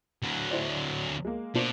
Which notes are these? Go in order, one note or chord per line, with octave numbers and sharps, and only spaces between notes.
D2 F#3
E4 C5 D5
G#3 A#3
B2 A#3 D4 C5